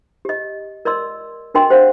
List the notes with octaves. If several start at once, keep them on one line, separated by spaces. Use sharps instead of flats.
G4 D#5
A#4 D5 D#5 C6 E6
D4 F#4 A#4 D#5 G5 C6
G4 C5 F5 F#5